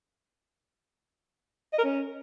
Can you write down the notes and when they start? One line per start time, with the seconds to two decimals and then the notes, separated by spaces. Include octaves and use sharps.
1.73 D#5
1.78 A#4
1.84 C#4